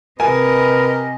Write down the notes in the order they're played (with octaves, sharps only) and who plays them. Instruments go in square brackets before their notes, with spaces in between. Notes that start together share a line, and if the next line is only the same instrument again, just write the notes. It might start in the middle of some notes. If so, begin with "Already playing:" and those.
[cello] C3 D#5 [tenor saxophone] A#4 [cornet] B4 [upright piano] G#5